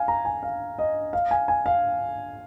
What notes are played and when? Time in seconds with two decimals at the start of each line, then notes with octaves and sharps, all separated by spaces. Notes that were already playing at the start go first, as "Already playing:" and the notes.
Already playing: F5 G#5
0.08 A#5
0.25 G#5
0.43 F5
0.79 D#5
1.13 F5
1.31 G#5
1.48 G#5
1.66 F5